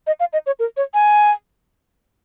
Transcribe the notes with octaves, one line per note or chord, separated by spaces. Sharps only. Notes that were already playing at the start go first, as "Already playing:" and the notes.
D#5
F5
D#5
C#5
A#4
C#5
G#5